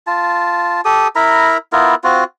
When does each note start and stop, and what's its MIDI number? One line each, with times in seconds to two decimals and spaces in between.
0.07 0.81 65
0.07 0.81 81
0.85 1.08 67
0.85 1.08 69
0.85 1.08 87
1.16 1.57 64
1.16 1.57 70
1.16 1.57 82
1.16 1.57 83
1.73 1.95 59
1.73 1.95 64
1.73 1.95 65
1.73 1.95 70
2.04 2.24 60
2.04 2.24 65
2.04 2.24 66